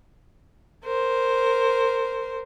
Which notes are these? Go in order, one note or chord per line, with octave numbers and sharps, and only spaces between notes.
A#4 C5